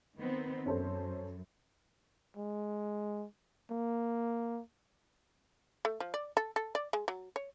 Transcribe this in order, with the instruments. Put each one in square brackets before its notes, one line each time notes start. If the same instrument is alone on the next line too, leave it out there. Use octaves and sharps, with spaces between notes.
[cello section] D#3 B3 C4
[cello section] F#2 [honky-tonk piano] C#4 A4 C5
[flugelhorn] G#3
A#3
[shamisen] A3
F3
D5
A4
A4
D5
G#3
F#3
C#5